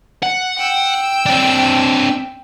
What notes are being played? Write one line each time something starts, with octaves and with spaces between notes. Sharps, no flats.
F#5
G5 E6
C4 D4